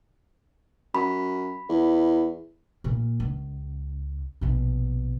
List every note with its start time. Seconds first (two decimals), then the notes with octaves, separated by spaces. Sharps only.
0.95 F#2 B5
1.69 E2
2.84 A#2 A#3
3.20 C#2
4.41 A#1 B2